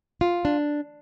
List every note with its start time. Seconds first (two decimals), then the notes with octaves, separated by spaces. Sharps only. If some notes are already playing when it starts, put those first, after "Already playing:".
0.21 F4
0.45 D4